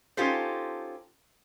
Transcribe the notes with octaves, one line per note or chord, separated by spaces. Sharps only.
C#4 D#4 F4 G4 A4 C5